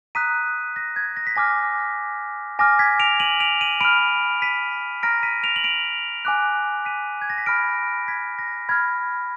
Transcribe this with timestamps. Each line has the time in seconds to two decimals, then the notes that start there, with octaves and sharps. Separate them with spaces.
0.15 A#5 D#6 F#6 B6 D#7
0.76 A#6
0.96 G#6
1.17 A#6
1.27 B6
1.36 G#5 D6 F6 A#6
2.59 G#5 D6 F6 A#6
2.79 G#6 B6
2.99 D7 F7
3.20 D#7 F#7
3.40 D7 F7
3.61 D#7 F#7
3.81 B5 F6 D7 F7
4.42 B6 D#7
5.03 A#5 F6 A#6 D7
5.23 B6 D#7
5.44 D7 F7
5.56 F#7
5.64 D7 F7
6.25 G#5 D6 F#6
6.85 B6 D#7
7.22 G#6
7.30 A#6
7.38 B6
7.46 B5 F6 A#6 D7
8.08 G#6 B6
8.39 A#6
8.69 B5 F6 G#6